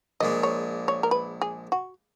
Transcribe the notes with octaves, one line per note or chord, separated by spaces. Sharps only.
A#1 A#2 G#3 D#5
C#5
C#5
A#4
B4
G#4
F#4